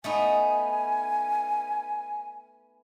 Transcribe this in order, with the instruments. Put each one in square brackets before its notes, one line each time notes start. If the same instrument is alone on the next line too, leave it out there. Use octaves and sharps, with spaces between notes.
[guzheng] A3 B3 D#4 [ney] G#5